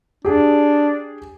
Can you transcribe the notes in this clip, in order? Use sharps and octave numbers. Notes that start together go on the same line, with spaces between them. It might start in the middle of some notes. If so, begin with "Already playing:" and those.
D4 G4 G#4